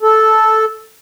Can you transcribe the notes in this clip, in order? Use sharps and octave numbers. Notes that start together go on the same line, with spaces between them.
A4